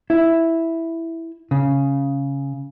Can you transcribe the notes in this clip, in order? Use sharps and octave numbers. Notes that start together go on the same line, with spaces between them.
E4
C#3